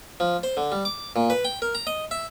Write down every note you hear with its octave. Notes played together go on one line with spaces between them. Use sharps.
F3
C5
D3
G3
D6
A#2
B4
G5
A#4
A#5
D#5
E5